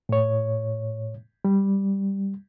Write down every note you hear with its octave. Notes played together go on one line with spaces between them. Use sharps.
A2 C#5
G3